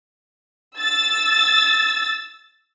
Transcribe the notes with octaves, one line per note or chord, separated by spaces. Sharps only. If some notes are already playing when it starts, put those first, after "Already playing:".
E6 A6